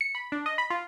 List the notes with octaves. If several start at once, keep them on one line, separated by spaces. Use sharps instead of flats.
C#7
B5
D4
D#5
B5
F4